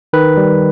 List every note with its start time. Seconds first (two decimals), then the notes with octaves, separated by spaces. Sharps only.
0.13 D#3 B4
0.37 G3